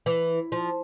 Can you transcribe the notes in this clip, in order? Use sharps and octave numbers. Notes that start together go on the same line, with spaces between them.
E3
F3